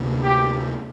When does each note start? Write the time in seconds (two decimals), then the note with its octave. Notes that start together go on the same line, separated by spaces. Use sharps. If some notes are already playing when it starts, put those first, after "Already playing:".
Already playing: D2 C3 A#3 D4
0.24 G4